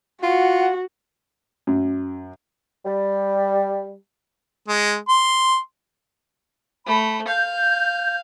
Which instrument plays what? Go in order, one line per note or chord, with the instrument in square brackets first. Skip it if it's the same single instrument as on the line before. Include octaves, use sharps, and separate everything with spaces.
[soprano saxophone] F4 [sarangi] F#4 [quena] F#5
[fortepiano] F#2
[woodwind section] G3
[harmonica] G#3
C6
[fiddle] A3 [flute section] B5
[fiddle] F5 [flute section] G6